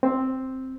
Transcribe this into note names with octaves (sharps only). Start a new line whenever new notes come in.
C4